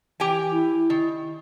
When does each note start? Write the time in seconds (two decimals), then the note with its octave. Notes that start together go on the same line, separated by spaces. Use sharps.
0.20 E3 G4 G5 G#5
0.51 E4
0.90 D#3